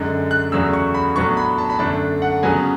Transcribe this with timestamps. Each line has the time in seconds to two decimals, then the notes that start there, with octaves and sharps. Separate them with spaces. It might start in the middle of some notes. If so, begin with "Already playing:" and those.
Already playing: F#2 D3 G#3
0.31 F#6
0.52 E2 C#3 F#3 A3 E6
0.73 C#6
0.95 B5
1.15 A2 F#3 B3 D4 C#6
1.37 B5
1.58 A5
1.70 B5
1.79 F#2 D3 A3 D4 A5
2.22 F#5
2.43 C#3 F#3 B3 G#5